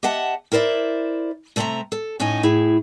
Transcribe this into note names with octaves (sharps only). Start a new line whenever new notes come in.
G4 D#5 E5 F#5 A5
E4 A#4 C5 D5 E5
C3 A3 C4 D5 E5 A#5
A4
A2 C#4 D#4 E4 D#5 G#5
A2 E4 G#4